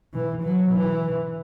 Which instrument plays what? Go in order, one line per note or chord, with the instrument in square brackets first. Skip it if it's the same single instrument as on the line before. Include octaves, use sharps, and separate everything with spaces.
[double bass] E3
F#3
E3